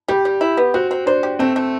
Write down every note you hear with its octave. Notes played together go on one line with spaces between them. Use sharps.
G3 G4
G3
E4
B3
C4 F#4
C4
D4 C5
G4
A3 C4
A3